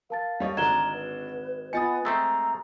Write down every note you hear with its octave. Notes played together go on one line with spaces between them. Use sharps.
A#4 F5 A5 A6
G3 C#5 D#5
G#1 D3 D4 F#4 A#5 G#6 E7 G7
B4
B3 F4 D#5 G#5 D#6 A6 C#7
G#3 A3 C4 A#5 E6